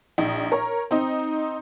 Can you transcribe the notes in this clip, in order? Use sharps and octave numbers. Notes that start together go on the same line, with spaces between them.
A#1 D#4
A#4 C#5
C4 D#4 D#5